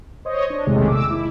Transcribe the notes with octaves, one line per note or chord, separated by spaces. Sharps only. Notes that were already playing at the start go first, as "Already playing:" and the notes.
C5 C#5 D#5
D4
A#1 E2 C3 D#3 G#3 A3
D6 E6
E4